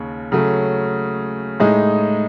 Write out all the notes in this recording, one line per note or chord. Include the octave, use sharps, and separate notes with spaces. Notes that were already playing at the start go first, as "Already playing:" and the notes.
Already playing: D#2 C#3
C#3 F#3 A3
A2 G#3 D#4